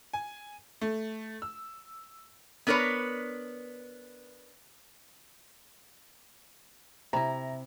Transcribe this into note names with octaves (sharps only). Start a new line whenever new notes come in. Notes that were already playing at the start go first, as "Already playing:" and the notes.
G#5
A3
E6
B3 D4 A#4 B4 C#5
C3 E4 A#5